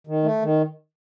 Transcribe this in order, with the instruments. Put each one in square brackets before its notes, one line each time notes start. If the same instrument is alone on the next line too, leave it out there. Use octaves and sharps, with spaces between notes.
[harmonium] D#3
A3
D#3